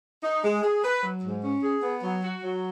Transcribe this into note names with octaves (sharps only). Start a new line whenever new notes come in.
D#4
G#3
G#4
B4
F#3
G#2
C#4
G#4
B3
F#3
F#4
F#3